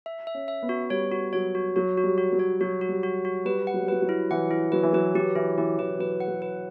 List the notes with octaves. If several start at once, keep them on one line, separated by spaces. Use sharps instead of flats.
E5
E5
C#4
E5
B3
F#4
G3 C#5
F#4
F#3 C#5
F#4
F#3 F#4
F#4
G3
F#4
F#3
C#5
F#3 F#4
F#4
G3
F#4
F#4
G3 B4
F#5
F#3
G3
F#3 B4
F#3
E4
E3 F#5
E4
F#3 B4
E3
F#3 B4
F#3 G4
E3 E4
E3 G4
E3 B4
F#3 B4
F#5
F#3
B4